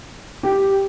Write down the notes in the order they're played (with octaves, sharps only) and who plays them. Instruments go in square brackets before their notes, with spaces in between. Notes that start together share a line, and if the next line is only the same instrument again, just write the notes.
[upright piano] G4